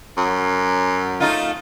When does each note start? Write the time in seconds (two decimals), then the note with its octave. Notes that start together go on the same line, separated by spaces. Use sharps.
0.17 F#2
1.20 A3 D#4 F4